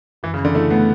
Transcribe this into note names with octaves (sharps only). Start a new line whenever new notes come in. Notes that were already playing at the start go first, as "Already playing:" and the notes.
F#2 E3
C#3
E3
D3
A3 E4
A3 B3